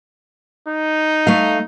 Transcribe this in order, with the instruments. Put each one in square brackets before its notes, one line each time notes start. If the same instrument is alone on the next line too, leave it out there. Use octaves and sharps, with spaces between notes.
[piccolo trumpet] D#4
[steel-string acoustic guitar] A3 F5